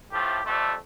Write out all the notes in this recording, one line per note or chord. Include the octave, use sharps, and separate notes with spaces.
A2 F3 A3 G4
F2 C3 G3 A3